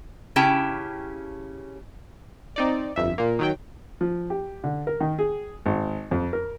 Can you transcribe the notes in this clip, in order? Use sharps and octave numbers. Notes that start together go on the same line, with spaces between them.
C#3 C#4 E4 G4 G5 A5
C4 D#4 D5
G1 F2 E5
A#2 A#3
D#3 F#3 G5
F3
G4
D3
A#4
D#3
G#4
G#1
F2
A#4